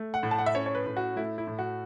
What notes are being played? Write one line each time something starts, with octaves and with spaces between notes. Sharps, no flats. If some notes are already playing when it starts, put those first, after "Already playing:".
Already playing: A3
F#5
A2
A5
F#5
E5
C#4 C#5
C#5
B4
A2
F#4
A3 E4
E4
A2
F#4